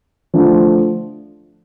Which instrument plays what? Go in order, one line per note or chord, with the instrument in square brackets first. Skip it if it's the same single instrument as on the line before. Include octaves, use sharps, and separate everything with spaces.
[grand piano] D3 F3 A3